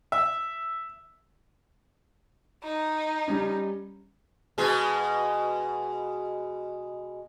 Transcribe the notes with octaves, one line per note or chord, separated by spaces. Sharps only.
E5
D#4
G3 C#4
B2 G#3 G#4